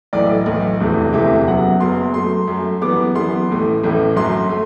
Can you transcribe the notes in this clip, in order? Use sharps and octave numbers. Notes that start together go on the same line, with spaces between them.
B1 A2 E3 D5
B1 A2 E3
E1 D2 C3 E3 A3
E1 D2 C3 E3 A3 E5
F#1 F#2 F#3 B3 F#5
F#1 F#2 F#3 B3 C6
F#2 F#3 A3 C6
F#2 F#3 A3
F#2 E3 G3 B3 D6
F#2 E3 G3 B3 C6
A1 A2 E3 A3
A1 A2 E3 A3
G1 F#2 F#3 A3 C6
A3